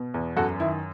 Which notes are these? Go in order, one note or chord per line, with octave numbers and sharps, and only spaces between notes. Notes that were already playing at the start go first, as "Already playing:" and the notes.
Already playing: B2
E2
F#2 F#4 A4
D#3 E4